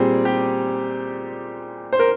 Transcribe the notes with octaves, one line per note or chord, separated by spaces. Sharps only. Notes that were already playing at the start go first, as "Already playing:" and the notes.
Already playing: A#2 G3 C4 G#4
G4
C5
A#4